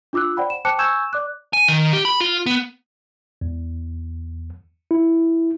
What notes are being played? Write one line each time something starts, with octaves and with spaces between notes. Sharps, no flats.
D4 F4 D6 E6 F#6
C5 D5 F#5 G5 B5
E7
C5 G5 A5 D6 F#6 C#7
G#5 C#6 E6 G6 G#6 E7
D5 D6 F#6
G#5
D#3
G4
B5
F4
B3
E2
E4